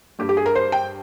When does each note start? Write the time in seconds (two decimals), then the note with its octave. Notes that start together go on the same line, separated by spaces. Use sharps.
0.19 G2 G3 G4
0.29 G4
0.37 G#4
0.46 A#4
0.55 C5
0.72 G5